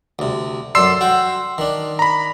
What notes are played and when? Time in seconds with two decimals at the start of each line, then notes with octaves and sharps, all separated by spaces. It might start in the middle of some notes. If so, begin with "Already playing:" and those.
0.19 D2 C3
0.75 F#2 A4 D5 C6 E6 C7
1.01 F#4 G5
1.58 D#3 D4
1.99 A#5 B5